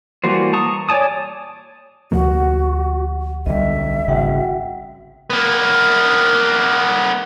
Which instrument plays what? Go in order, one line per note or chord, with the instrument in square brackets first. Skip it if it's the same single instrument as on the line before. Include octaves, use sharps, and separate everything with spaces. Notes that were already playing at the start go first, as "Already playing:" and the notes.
[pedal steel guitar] E3 G3 A#3 F#4 C5
A5 A#5 C#6 D#6
C#5 D5 G#5 A5 D#6
[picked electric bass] D2 F3 A#3 [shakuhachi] F#4 [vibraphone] G4 F#5
[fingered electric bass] B1 D3 [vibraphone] G3 D#5 [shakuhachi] E5
[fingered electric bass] G#1 C#3 [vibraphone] F#4 F#5 G5
[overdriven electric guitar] A#3 B3